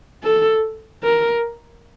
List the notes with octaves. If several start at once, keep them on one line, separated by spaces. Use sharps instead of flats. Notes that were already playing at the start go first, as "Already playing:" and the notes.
A4
A#4